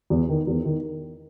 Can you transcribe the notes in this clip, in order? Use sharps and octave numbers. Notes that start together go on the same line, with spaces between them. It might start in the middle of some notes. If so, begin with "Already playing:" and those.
E2
D#3
E2
D#3